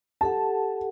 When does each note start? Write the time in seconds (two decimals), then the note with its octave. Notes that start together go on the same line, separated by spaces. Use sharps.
0.21 G4 A4 F#5 A5